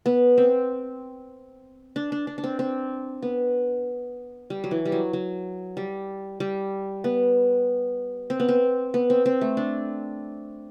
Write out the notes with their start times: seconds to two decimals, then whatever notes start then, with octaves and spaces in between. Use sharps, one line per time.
0.06 B3
0.38 C4
1.96 D4
2.12 D4
2.27 D4
2.38 D4
2.44 C4
2.59 C4
3.23 B3
4.50 G3
4.64 F#3
4.71 E3
4.85 G3
4.92 F#3
5.13 F#3
5.77 G3
6.40 G3
7.04 B3
8.30 C4
8.40 B3
8.49 C4
8.94 B3
9.10 C4
9.26 C4
9.41 A3
9.57 D4